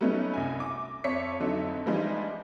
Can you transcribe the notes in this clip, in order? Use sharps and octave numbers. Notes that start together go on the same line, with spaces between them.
F#3 G3 A3 B3 C#4 D#4
C2 F#2 G#5
D6
F2 C#5 E5 B6 C#7
F2 D3 F#3 D#4 E5
E3 F3 G3 G#3 D4 D#4